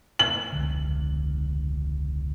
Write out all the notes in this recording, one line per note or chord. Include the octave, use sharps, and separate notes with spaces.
F#7
E1 C#2 D3